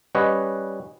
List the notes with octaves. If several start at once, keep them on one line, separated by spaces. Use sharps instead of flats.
G3 C#4 B4 C#5 D#5 F#5